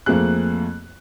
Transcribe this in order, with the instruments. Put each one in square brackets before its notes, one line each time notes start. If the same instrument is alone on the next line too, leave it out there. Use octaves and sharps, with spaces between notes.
[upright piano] F2 A3 A#3 C4 G#4 F#6